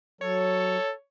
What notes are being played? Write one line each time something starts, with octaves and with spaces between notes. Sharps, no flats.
F#3 A4 C#5